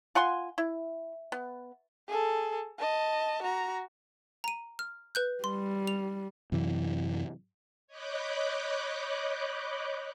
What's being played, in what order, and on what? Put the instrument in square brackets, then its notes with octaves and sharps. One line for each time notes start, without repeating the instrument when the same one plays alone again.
[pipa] F4 F#5 G#5 C6
E4
B3
[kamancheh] G#4 A4
D#5 A5
F#4 A#5
[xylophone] A#5 D#7
F6
B4 F#6 G6
[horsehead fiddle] G3 [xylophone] C6
[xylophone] F7
[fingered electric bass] F#2 C3 E3
[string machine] C#5 D#5 B5 D6 F#6 G6